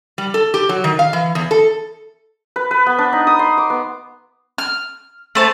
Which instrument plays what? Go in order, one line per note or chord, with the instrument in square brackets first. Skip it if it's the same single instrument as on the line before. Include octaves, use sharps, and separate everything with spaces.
[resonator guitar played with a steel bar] G3
A4
G4
F#3
D#3
F5
E3
E2
A4
[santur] B4
B4
B3
D4
D#4
D#6
C6
D6
B3
[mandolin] F6
A3 C5 A5